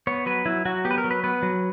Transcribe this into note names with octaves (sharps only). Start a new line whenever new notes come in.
B3 C#5
F#3 B4
F#3 E4
F#3 F#4
B3 G4
B4
A#4
F#3
B4
B3 B4
F#3